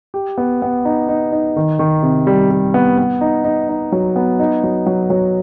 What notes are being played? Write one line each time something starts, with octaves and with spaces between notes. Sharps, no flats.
G4
B3
B3
D#4
D#4
D#4
D#3
D#3
C3
G3
G3
B3
B3
D#4
D#4
D#4
F#3
B3
D#4
F#3
F#3
F#3